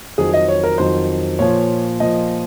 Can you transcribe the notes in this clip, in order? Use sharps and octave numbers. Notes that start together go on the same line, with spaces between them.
F2 D#3 F#3 G#4
D#5
C#5
A#4
F2 D#3 F#3 C5
A#2 F3 C#5
A#2 F3 D#5